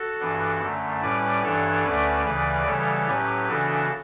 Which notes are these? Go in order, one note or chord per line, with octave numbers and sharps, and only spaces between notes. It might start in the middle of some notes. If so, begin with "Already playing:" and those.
Already playing: F#4 A4
G2 E3 B3 D4
F#2 D3 A3
A2 G3 C#4 B4 D5
G2 E3 B3 D4 A4 C#5
D2 D3 A3 C#4 B4 D5
D2 C#3 E3 B4 D5
C#3 E3 G3 B3 A4 C#5
A2 F#3 C#4 G4 B4
C#3 E3 B3 D4 F#4 A4